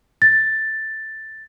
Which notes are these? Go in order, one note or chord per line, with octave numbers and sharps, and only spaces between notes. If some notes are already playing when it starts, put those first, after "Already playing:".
A6